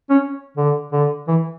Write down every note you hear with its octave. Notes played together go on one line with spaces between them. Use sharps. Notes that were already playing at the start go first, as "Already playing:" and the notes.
C#4
D3
D3
E3